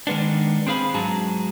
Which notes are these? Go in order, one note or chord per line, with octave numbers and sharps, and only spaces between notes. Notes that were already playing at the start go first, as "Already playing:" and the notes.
D#3 G#3 B3 D4
C4 D4 G#4 F5 B5
G#2 F#3 G#4 A5 A#5